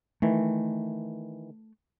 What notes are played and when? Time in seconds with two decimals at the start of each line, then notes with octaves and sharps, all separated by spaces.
0.22 D#3 E3 A3